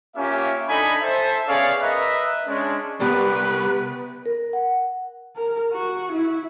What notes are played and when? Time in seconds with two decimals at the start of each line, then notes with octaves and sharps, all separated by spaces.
0.16 A#3 C#4 F4 G4 E5
0.68 D4 D#4 A4 G#5 B5
1.01 A4 C5 E5
1.48 B3 C#4 G#4 C#5 D5 F5
1.81 A#4 B4 D#5 E5
2.47 G#3 C#4 D4
3.00 C2 B3 G4 B4 D5
4.26 A#4
4.53 F#5
5.36 A#4
5.73 F#4
6.12 E4